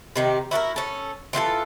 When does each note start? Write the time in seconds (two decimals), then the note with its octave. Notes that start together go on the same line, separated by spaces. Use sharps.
0.16 C3 D#3 G4
0.51 E4 F#4 A4 A#4
0.76 C#4 A4
1.33 E3 F4 G4 A4